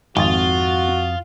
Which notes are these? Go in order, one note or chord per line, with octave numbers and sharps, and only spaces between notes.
G#1 F2 F4 F#4 D#6 A6